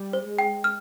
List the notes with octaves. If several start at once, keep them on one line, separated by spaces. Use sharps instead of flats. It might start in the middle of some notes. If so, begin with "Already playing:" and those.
Already playing: G3
C5
G#3
G5
F6